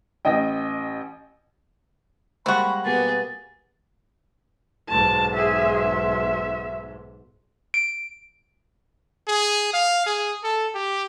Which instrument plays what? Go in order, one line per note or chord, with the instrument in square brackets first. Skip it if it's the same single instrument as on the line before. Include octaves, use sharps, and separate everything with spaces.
[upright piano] A1 D#5 G5
[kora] G3 G#3 A#3 [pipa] C4 F#4 [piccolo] B5
[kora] B2 A#3 G4 [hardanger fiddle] B3 G#4 [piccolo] A6
[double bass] B1 G#2 [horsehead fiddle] A5
[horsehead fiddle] G#4 E5
E5
[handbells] D7
[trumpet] G#4
F5
G#4
A4
G4